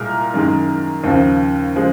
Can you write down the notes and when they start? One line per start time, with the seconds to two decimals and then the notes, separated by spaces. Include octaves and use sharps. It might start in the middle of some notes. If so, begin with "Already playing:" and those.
Already playing: C2 A#2 G#3 A#4
0.34 F#2 D#3 G#3
1.04 D#2 C#3 F3
1.75 C#3 F3 G#3